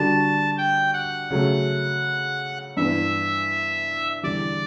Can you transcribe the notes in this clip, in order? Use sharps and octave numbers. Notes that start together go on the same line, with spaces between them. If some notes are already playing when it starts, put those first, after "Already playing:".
Already playing: D3 G3 D4 F#4 A5
G5
F#5
C#3 F#3 A3
G2 E3 B3 E5
E2 D3 G3 D5